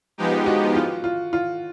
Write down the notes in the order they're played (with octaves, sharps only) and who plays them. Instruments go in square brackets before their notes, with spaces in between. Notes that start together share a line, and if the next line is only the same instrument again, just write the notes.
[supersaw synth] F3 G#3 B3 D#4 G4
[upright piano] F#4
F4
F4
F4